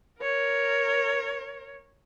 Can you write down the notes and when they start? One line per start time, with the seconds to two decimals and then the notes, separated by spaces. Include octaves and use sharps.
0.20 A#4 C#5